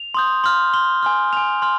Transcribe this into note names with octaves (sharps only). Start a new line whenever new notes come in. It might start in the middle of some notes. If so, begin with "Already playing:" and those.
Already playing: F7
C6 D#6 G6
C6 F6
C6 F6 G7
G#5 C6 F6
G#5 C6 F6 F7
C6 F6